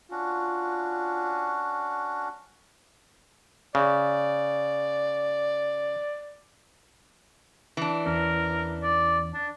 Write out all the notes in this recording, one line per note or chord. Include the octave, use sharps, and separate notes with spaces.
C#4 D4 F4 F#4
C#3 D5
E3 D4
E2 C#4 A#4
D5
D4